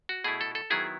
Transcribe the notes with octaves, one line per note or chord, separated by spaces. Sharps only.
F#4
B2 A3 E4 G#4
A4
A4
D#3 F#3 B3 E4 G#4